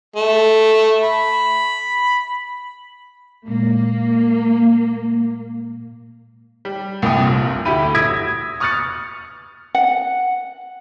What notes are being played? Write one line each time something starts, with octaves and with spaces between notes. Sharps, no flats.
A3
B5
A#2 G#3 A#3
G3
C2 A#2 G5 D#6
A#1
D2 E4 G4 B5 D#7
D#6 E6 G#6 A#6 B6 D7
C#6 D#6 F6 F#6 A6 C#7
F#5